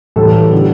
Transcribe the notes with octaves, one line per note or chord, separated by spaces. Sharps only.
A2 E3 G3 A4
D3 G3